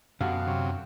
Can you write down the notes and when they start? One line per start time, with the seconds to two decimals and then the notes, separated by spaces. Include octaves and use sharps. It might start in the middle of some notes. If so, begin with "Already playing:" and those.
0.21 F#2 B2 D3 F#4 G4 F5
0.47 C3 F#3